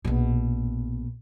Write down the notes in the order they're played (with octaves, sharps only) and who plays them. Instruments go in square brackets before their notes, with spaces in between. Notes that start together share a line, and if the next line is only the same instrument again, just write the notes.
[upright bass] A#1 B2